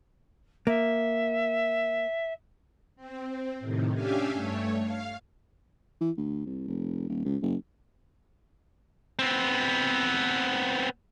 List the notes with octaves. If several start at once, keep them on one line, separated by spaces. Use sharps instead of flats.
A#3 E5
C4
A2 C3 D#3
C#4 D4 G4 E5 F5 G#5
G2 A3 C#5
F5
E3
D2
C2
F1
D#1
C#2
F#1
B3 C4